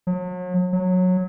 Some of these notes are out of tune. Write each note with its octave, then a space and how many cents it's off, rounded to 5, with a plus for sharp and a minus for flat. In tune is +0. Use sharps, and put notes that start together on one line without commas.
F#3 -40
F#3 -15